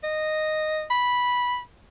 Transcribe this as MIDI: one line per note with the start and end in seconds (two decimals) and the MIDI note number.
0.03 0.84 75
0.90 1.60 83